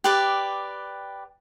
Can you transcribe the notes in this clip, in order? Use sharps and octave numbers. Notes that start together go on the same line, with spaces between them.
G4 B4 D5